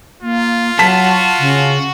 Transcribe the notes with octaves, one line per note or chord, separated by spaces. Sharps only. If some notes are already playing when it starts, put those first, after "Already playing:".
A#3 F4
F#3 F#4 A5 B6
C#3